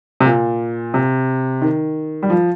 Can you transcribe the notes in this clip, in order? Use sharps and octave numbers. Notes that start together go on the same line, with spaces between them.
C3
A#2
C3
D#3
G3
F3